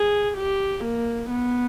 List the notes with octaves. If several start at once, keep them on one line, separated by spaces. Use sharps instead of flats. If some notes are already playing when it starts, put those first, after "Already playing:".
Already playing: G#4
G4
A#3
B3